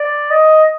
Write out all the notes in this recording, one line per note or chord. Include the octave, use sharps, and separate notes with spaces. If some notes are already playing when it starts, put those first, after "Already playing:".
Already playing: D5
D#5